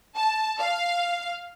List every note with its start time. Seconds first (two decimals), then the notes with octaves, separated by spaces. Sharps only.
0.16 A5
0.59 F5